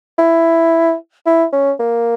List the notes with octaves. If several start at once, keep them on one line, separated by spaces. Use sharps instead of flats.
E4
E4
C#4
A#3